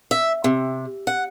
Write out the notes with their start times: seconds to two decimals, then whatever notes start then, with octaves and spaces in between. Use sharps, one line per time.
0.11 E5
0.44 C3
1.07 F#5